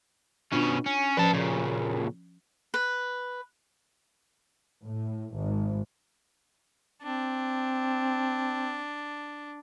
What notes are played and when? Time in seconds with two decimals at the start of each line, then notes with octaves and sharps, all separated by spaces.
0.52 B2 C#4 D4 F4
0.86 C#4
1.17 F3 C#4 B4 C5 A5
1.33 A#2 C#3
2.74 B4
4.84 A2
5.37 G#1
7.02 C4 D4